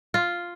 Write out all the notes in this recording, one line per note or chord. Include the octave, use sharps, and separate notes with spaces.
F4